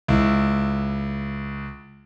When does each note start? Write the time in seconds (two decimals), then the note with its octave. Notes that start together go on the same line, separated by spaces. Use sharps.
0.08 C#2 E4